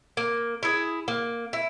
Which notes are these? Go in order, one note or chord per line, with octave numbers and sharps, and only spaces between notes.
A#3
E4 G#4
A#3
E4